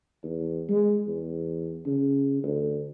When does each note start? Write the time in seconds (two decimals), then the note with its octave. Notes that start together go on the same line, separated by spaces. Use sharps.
0.23 E2
0.69 G#3
1.07 E2
1.86 C#3
2.43 D2